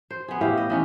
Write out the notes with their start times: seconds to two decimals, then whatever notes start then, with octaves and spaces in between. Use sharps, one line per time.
0.11 C5
0.28 B3 G#4
0.41 A2 E4 G4 F5
0.58 D#5
0.70 E3 C#4 D#4